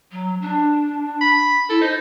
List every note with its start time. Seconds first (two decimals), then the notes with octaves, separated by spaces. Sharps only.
0.12 F#3
0.42 D4
1.21 B5
1.69 E4 A4
1.81 D#4 C5